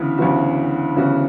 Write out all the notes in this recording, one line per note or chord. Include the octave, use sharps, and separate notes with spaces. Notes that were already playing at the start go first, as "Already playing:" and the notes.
Already playing: D2 C#3 E3 B3
D2 C#3 E3 B3 F#4
D2 C#3 E3 B3 F#4